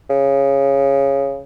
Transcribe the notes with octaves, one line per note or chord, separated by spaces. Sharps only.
C#3